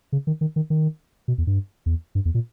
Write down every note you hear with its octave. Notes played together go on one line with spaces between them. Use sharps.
C#3
D#3
D#3
D#3
D#3
B2
E2
G2
E2
G2
E2
A#2